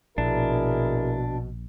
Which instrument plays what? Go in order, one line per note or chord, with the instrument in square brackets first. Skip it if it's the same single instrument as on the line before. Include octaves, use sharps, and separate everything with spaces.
[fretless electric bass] A#1 [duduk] B2 [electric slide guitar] D4 [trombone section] E4 G#4 A#4